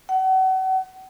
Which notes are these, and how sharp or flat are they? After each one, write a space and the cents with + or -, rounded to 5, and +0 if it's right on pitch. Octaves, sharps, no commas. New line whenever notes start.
F#5 +35